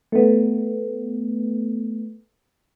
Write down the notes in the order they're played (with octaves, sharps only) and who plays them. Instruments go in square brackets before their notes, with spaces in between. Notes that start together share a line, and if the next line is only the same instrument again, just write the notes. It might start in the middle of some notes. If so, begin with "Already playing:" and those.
[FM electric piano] A3 B3